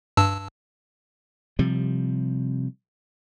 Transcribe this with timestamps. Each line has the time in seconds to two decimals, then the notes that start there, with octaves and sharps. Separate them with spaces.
0.17 G2 A5 E6
1.59 C3 F3 G3